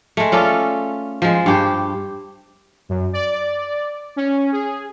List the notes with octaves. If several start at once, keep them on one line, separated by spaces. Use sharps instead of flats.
G#3 A3
C#4 F4 A4 D5
F3 G#3
G2 G4 C5
F#2
D5
C#4
G#4